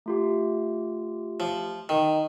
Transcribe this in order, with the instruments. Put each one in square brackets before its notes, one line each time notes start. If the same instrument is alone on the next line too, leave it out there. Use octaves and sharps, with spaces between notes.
[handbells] A3 F4 G4
[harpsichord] F3
D#3